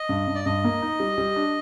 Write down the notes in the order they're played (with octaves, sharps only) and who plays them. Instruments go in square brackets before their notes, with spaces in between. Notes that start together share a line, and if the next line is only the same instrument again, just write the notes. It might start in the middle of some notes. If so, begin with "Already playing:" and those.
Already playing: [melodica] D#5
[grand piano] G2
G2
[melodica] D5
[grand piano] G2 [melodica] D#5
[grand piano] A#3
D#4
G3
G3
D4